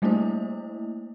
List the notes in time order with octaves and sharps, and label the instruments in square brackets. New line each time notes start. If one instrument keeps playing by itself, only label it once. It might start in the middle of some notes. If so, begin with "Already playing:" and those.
[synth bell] G3 A3 A#3 D4 E4 C5